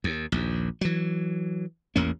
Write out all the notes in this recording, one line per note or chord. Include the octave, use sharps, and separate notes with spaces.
D#2
A#1 D#2
E3 F#3
A1 E2 A#3 C#4